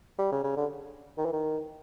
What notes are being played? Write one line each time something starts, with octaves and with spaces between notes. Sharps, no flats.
G3
C#3
C#3
D3
D#3
E3
D#3